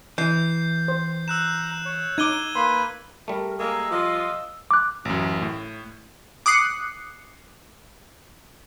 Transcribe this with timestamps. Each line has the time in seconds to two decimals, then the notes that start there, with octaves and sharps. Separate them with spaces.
0.18 E3 G6 C7
0.88 C5
1.28 A#5 E6 F#6 E7
1.85 C#5
2.18 D#4 D6 G#6 D#7 G7
2.56 A#3 B4 B5 C6
3.28 G3 A3 A#4
3.59 G#3 A#3 A#4 E6
3.91 F3 F4 D#5
4.71 D6 F#6
5.05 A1 F#2
5.42 A2
6.46 D6 D#6 F#6 C7 C#7